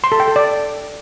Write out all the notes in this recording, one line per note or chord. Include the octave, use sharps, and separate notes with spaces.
C6
A4
G5
A4
D5